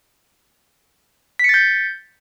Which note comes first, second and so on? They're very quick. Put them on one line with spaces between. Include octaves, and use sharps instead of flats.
B6 C#7 A6 G6